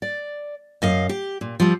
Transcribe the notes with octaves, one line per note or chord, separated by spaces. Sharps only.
D5
F#2 D#5 F5
G4
A#2
F3 G3 C4